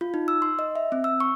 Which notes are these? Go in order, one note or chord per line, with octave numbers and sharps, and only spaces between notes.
F4
D#4
E6
C6
D#5
E5
C4
E6
C#6